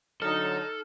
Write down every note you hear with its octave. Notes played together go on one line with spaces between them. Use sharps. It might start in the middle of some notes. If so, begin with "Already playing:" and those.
D3 F#3 D#4 A4 F6